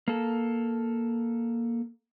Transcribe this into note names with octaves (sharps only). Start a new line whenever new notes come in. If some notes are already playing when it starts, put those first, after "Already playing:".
A#3 A4